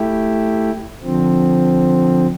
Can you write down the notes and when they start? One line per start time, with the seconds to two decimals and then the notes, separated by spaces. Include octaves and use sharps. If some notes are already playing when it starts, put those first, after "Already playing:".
Already playing: A3 E4 G4
1.03 D3 F3 C4